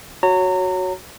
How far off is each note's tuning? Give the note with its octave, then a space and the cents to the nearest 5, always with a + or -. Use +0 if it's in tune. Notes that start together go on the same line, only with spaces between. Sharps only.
F#4 +0 C#5 +0 A#5 -30